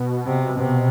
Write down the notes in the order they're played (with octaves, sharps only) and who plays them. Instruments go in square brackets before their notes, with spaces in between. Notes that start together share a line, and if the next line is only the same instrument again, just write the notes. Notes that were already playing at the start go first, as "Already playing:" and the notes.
Already playing: [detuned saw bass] B2
[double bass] C3
C3